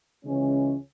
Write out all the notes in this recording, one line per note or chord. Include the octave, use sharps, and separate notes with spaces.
C#2 C#3 E3 G#3 C#4